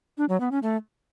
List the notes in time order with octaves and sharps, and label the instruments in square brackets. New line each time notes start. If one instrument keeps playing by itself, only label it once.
[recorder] D4
F#3
B3
C#4
A3